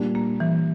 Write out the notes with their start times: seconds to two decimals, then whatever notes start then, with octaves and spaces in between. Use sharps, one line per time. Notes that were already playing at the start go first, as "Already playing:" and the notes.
Already playing: A#2 G3 D4
0.15 A#3
0.40 E3